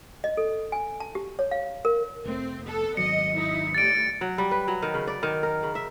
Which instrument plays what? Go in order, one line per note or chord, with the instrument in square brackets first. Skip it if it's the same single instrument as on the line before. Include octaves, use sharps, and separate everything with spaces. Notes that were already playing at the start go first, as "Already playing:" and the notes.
[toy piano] D#5
A4
G#5
A5
G4
C#5
F5
A#4
[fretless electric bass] F1 A3 [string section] C4
[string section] B3 A4
[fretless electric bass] G#1 D#3 F#3 [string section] D#5 [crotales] C#7
[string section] D#4 E4
[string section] A2 G3 [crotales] A6 D7
[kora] F#3
G3
B4
F#3
D#3
C#3
D5
D#3
A#4
C#3
E5